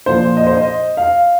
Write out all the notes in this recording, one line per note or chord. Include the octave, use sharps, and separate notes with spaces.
A#2 F3 C5
D#5
C5
D#5
F5